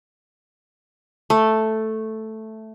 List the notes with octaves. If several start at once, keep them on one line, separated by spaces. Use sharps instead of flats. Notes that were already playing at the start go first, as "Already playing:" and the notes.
A3